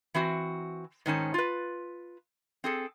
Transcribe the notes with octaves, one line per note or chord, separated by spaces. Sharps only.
E3 C4 F#4
G#2 D#3 C#4 A5
F4 B4
C4 G#4 A4